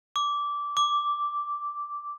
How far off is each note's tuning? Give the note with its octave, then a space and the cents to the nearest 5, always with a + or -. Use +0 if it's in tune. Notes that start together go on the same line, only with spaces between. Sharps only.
D6 -15
D6 -5